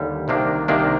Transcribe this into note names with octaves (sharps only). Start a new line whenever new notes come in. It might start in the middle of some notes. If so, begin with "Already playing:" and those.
Already playing: D#2 D3 G3
C2 C3 D#3 A#3 D4
C2 C3 D#3 A#3 D4